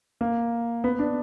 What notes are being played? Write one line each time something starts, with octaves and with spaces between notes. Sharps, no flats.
A#3
B3
D4